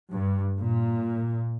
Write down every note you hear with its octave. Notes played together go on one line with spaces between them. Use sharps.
G2
A#2